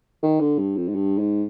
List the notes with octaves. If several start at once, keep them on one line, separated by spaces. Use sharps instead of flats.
D#3
D3
G2
F2
G#2
G2
G#2